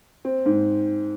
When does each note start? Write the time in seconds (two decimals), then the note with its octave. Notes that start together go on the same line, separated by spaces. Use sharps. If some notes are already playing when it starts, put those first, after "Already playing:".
0.25 C4
0.46 G#2